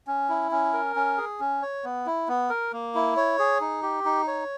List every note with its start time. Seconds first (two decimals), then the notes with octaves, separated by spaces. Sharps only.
0.07 C#4
0.29 E4
0.51 C#4
0.73 A#4
0.96 C#4
1.18 G#4
1.40 C#4
1.62 C#5
1.85 B3
2.06 E4
2.28 B3
2.50 A#4
2.73 A#3
2.95 E4
3.17 C#5
3.39 G#4
3.61 D#4
3.83 G4
4.05 D#4
4.28 C#5